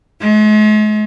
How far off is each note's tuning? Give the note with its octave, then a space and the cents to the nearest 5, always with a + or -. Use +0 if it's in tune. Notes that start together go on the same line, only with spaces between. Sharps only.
G#3 +45